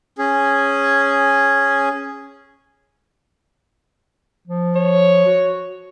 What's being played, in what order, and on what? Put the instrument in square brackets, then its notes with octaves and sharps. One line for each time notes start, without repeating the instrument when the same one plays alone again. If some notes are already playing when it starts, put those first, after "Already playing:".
[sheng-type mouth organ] C#4 G#4
[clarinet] F3
[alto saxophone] C#5
[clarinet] F#4